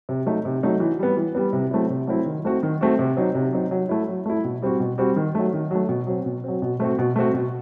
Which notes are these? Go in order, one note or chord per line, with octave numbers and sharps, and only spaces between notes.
C3
F#3 A3 D#4
C3
F#3 A3 D#4
E3
G3 B3
E3
G3 B3
C3
F#3 A3 C4 E4
C3
F#3 A3 C4 E4
D#3
A3 C4 F#4
D#3
A3 C4 F#4
C3
F#3 C4 D#4
C3
F#3 C4 D#4
F#3
A3 E4
F#3
A3 E4
B2
G3 C4 F#4
B2
G3 C4 F#4
D#3
F#3 A3
D#3
F#3 A3
B2
F#3 C4
B2
F#3 C4
B2
A3 C4 F#4
B2
A3 C4 F#4
B2